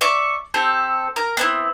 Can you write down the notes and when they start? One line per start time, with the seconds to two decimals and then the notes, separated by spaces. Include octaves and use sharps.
0.01 D5 E5 C#6 D6
0.54 C4 G4 A4
1.16 A#4
1.37 B3 C4 E4